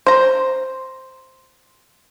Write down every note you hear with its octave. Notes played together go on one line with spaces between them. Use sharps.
C5 A#5